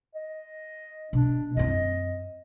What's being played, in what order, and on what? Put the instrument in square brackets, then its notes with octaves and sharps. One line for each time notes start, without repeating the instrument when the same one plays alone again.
[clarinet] D#5
[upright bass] B2 [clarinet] D4
[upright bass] F#2 C4 [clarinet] D#5